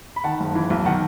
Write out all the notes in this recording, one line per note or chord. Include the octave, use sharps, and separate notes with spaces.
B5
D#3 F#5 A5
F#1
E3
B1
D#3 F#5 A5